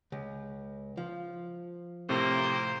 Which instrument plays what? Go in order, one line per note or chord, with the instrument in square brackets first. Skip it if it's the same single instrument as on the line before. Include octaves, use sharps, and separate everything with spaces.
[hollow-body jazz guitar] C#2
F3
[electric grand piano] A2 C3 C4 [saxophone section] A#3 [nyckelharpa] C5